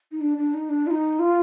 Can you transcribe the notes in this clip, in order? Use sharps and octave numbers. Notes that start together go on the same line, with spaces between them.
D#4
D4
D4
D#4
D4
F4
D#4
F4